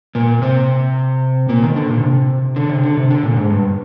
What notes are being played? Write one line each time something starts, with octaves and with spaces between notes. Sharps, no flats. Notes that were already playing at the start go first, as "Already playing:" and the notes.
A#2 A#3
C3 C4
A#2 A#3
D#3
D3
A#2
C3
D3
C3
D3
C3
D3
A#2
G#2
G2